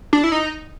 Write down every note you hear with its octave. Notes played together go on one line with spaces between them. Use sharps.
D4
E4
D#4